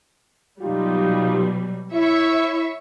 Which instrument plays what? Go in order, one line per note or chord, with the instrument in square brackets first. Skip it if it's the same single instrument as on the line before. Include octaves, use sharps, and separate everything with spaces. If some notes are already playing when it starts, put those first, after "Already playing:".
[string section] B2 F#3 G3 [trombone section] D#4 F4 G4
[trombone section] E4 [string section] C#5 E5 C#6